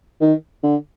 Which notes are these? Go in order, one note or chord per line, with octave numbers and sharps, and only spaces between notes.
D#3
D3